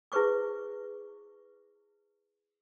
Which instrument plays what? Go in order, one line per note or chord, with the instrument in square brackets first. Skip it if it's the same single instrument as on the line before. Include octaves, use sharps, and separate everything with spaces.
[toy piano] E4 G#4 B4 C5 C#6 D6